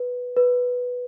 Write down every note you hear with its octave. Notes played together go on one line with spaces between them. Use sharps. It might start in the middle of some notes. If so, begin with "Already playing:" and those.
Already playing: B4
B4